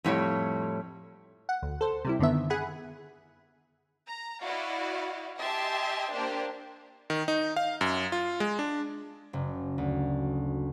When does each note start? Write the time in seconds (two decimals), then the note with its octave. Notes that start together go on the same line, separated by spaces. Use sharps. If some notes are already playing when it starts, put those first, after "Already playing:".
0.04 F2 A2 G3 C#5
1.49 F#5
1.62 D2
1.81 A4 C5
2.05 C3 G3 E4
2.19 F#2 D3 D#3 B3 E5
2.50 G#4 F#5 G#5 B5
4.08 A#5
4.44 E4 F#4 D5 D#5 F5
5.38 G4 D#5 E5 G#5 A5 C6
6.13 A#3 D4 G4 C5
7.10 D#3
7.28 D#4
7.56 F5
7.81 F#2
8.12 F4
8.40 G#3
8.59 D4
9.33 F#1
9.78 D2